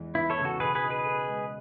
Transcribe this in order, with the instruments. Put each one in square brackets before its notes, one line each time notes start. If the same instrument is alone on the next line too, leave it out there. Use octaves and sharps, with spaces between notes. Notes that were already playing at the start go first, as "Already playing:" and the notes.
Already playing: [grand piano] E2 E3 G#3
[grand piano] B3 [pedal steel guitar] E4
[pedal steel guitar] A4 C#5
[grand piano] C#3
[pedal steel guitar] F#4 A4
[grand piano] B2 [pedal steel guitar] G#4 B4
[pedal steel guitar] G#4 B4
[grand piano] D#4
[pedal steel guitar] G#4 B4
[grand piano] A4
G#3